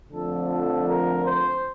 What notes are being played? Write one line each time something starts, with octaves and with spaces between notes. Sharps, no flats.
F2 D3 F3 A3 A4
A4
A#4
C5